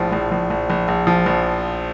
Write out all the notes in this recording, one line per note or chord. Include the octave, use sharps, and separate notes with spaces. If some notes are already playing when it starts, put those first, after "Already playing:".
Already playing: A#1 A2 F3
A#1
A#1
A#1
A#1
A#1
F3
A#1